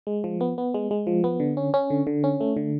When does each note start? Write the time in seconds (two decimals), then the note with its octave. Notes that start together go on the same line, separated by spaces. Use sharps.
0.07 G#3
0.24 F3
0.41 B3
0.58 B3
0.74 G#3
0.91 G#3
1.07 F3
1.24 B3
1.40 D3
1.57 C#4
1.74 C#4
1.90 D3
2.07 D3
2.24 C#4
2.41 A3
2.57 D3